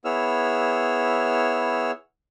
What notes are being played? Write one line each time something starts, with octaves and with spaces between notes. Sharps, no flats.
B3 E4 G#4 C#5 E6 F6